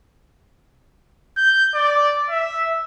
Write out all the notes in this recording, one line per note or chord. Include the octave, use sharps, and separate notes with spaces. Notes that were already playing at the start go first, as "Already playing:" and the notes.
G6
D5
E5